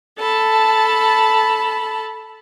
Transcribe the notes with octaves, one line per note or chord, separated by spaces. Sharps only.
A4 A5 B5